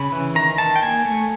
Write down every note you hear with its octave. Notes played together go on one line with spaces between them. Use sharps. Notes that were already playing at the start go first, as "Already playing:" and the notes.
Already playing: C#3 B5
E3
D#3 A#5
D#3 A5
G5
A#3 G#5
A3